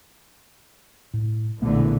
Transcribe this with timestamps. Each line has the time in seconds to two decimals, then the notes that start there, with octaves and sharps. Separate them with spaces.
1.14 A2
1.62 A#1 B2 D3 E3 A3 B3